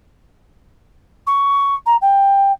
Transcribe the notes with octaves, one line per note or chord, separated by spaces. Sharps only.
C#6
A#5
G5